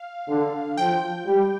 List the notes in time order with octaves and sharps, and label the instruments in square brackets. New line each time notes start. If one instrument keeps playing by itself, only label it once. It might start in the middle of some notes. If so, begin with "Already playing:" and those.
Already playing: [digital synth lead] F5
[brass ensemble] D3
[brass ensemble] F3 [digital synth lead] G5
[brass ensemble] G3